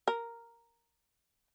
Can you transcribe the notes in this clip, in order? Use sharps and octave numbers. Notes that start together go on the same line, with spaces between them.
A#4